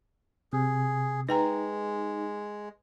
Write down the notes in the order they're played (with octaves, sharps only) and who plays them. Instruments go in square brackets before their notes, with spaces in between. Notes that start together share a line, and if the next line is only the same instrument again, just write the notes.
[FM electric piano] C3 [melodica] G#4
[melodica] G#3 [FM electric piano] D#4 [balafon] B4 G5 A#5